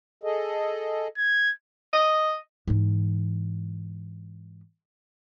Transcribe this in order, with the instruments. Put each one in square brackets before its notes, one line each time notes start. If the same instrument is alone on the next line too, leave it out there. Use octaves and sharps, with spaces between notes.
[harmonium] G#4 A4 D#5
[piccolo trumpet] G#6
[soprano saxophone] D#5
[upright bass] G#2 E3